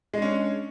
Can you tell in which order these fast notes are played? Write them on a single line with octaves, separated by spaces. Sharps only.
G#3 D4 C#4